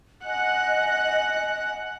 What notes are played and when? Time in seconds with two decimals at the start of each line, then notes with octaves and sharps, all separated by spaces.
0.25 D#5 F#5 G#5 F#6